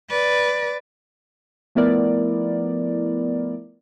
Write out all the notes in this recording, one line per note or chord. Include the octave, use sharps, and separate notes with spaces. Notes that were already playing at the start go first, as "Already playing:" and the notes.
B4 D5
F3 A3 B3 E4 A#4 D5